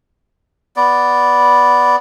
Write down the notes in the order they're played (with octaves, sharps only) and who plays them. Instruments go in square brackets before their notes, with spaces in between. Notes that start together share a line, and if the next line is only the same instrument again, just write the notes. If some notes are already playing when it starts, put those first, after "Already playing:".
[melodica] B3 D5